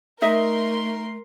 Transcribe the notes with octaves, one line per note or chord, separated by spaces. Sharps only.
A3 D#4 A#4 D#5 E5 C6